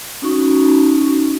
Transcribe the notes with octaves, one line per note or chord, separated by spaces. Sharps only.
C#4 D#4 F#4 C#6